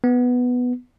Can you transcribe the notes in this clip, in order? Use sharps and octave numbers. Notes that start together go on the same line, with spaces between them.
B3